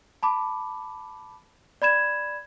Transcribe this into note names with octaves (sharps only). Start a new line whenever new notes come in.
A5 B5 D6
D5 B5 G#6 E7